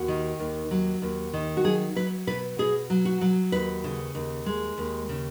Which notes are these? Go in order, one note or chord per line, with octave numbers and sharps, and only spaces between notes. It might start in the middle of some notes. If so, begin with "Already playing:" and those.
Already playing: D#2 F#4
D#3
D#2
F#3
D#2
D#3
F#4
F#3 G#4
F#3 B4
B2 B4
B2 G#4
F#3
F#4
F#3
D#2 B4
C#3
D#2
G#3
D#2
C#3